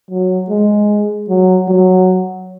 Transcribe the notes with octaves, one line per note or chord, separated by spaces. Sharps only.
F#3
G#3
F#3
F#3